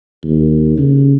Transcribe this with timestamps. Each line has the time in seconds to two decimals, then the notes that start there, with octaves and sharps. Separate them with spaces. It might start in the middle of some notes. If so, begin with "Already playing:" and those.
0.25 D#2
0.78 C#3